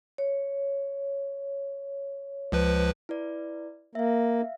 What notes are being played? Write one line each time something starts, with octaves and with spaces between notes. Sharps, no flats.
C#5
C#2 F3 B4
E4 B4 D5
A#3 E5 F5